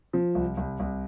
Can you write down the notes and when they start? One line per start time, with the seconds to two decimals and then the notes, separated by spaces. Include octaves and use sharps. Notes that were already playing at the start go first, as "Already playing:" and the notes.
0.13 F3
0.35 C2
0.57 C2
0.80 C2